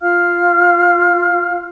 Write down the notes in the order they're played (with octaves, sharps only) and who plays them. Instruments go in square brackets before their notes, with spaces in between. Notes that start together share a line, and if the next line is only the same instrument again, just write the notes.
[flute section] F4 F5 F6